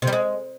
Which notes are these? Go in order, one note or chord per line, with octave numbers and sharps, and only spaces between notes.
C3
G3
G#3